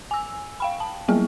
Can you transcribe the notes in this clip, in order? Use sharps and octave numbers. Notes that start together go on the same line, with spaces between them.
G#5 E6
F5 G5 B5
A5
F#3 G3 A#3 B3 E4 G#4